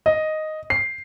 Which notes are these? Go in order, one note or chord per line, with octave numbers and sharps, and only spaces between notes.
D#5
C7